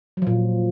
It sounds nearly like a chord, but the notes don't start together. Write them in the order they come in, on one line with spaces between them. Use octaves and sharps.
F#3 F3 A#2